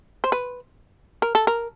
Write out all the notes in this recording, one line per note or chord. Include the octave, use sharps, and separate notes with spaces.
C5
B4
A#4
A4
A#4